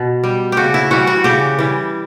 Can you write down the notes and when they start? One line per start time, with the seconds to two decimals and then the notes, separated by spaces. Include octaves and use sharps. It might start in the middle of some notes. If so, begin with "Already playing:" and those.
Already playing: B2
0.24 G3
0.52 C#3 F#4 G4
0.74 E4
0.91 E3 G3 F#4
1.07 F#4
1.24 C#3 G4
1.59 E3 G3